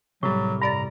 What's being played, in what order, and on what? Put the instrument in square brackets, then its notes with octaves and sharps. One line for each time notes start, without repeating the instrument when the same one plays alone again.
[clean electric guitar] C2 G3 [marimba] A2 [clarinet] F#3
[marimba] G2 D5 A6 [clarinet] A#5